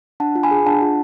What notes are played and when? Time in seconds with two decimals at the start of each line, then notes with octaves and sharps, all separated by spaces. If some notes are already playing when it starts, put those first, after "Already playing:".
0.20 D4 F#5 A5
0.35 F4
0.43 G#5 B5
0.51 G#4
0.66 D4 F#5 A5
0.82 F4